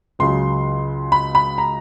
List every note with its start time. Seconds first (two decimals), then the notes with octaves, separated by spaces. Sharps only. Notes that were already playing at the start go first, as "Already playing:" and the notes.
0.19 C#2 C#3 F#3 C6
1.12 B5
1.35 B5
1.58 A#5